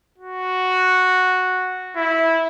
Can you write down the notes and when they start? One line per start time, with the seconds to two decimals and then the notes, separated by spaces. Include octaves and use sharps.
0.18 F#4
1.96 E4